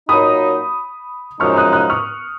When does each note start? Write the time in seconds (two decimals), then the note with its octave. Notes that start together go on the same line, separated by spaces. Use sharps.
0.09 A#2 F#3 A#3 D#4 B5 D#6
1.40 F#2 F3 G#3 D#4 C#6 F6
1.56 D#6 F#6
1.73 D#6 F#6
1.90 C#6 F6